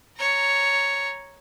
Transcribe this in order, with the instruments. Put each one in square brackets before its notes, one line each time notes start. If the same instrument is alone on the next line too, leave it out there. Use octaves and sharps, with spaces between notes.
[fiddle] C#5 A#5